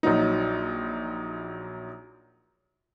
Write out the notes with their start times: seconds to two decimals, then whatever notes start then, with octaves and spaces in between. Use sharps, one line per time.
0.03 A#1 F#3 D#4